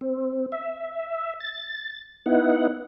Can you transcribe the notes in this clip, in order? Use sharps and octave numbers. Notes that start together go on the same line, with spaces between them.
C4
E5
A6
B3 D#4 E4 F#5